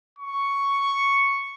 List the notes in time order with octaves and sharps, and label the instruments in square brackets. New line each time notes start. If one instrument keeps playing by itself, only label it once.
[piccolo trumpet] C#6